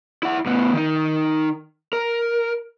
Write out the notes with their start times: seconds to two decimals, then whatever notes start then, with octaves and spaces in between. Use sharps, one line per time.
0.23 E4 F#5
0.46 A2 B3
0.74 D#3 D#4
1.93 A#4